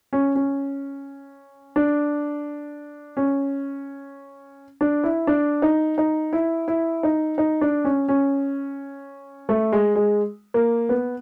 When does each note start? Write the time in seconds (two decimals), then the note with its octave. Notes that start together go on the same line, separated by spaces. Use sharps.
0.13 C#4
0.35 C#4
1.76 D4
3.17 C#4
4.81 D4
5.04 E4
5.27 D4
5.62 D#4
5.98 D#4
6.33 E4
6.68 E4
7.03 D#4
7.38 D#4
7.61 D4
7.85 C#4
8.09 C#4
9.49 A3
9.72 G#3
9.95 G#3
10.54 A#3
10.89 B3